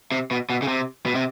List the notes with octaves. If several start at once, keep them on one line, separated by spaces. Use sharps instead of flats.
C3
B2
B2
C#3
C3
B2
C3